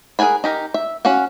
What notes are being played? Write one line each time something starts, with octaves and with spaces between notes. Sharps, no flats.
G#4 A#4 F#5 G#5 B5
D#4 G4 A#4
E5
C#4 F#4 F5 F#5